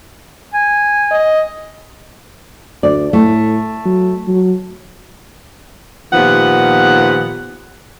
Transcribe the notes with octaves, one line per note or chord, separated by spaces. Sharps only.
G#5
D#5
D2 D5
A2 A3
F#3
F#3
A#2 D#3 F3 B3 G4 F#5